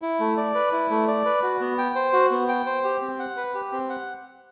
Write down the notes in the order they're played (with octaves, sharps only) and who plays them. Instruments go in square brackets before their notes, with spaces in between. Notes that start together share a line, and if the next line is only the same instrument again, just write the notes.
[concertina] E4
A3
D5
B4
E4
A3
D5
B4
F#4
B3
G5
C5
F#4
B3
G5
C5
G4
C4
F#5
B4
G4
C4
F#5